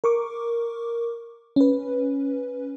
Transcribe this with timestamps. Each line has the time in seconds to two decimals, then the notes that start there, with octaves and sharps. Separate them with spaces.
0.04 A#4 C#6 D6
1.56 C#4 B4